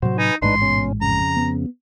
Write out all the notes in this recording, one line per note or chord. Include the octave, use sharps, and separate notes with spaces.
A2 C3 F#3 F#4 C5
D#4 B4 G#5
A1 G#2 G#3 D4 D#4 B4 C6
B2 C#4
F2 C#3 A#5
B3